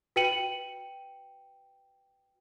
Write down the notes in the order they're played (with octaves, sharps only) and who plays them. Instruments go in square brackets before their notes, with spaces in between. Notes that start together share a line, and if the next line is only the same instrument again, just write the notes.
[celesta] F#4 B4 G5 C#7 D#7 F#7